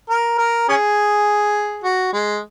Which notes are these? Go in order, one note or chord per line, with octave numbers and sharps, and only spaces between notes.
A#4
A#4
C#4 G#4
F#4
G#3